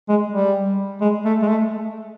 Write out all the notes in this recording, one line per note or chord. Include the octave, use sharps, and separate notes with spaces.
G#3
G3
G#3
A3
G#3
A3